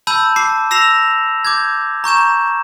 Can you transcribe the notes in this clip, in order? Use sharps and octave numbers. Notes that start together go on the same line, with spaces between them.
A5 B5 E6 G6 D#7
A5 D6 C7
E6 A#6 C7 E7 F7
D6 G6 G#6
A#5 C#6 G6 E7